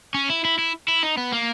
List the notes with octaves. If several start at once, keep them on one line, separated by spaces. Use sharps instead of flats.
C#4
E4
E4
E4
E4
D#4
B3
A#3